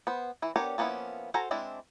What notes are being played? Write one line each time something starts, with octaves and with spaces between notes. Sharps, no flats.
B3 C5
E3 E4
B3 D4 G4 A#4 C#5
F3 A#3 B3 C#4 E4
F#4 A4 C5 G#5 A#5
G#3 C4 D4 E4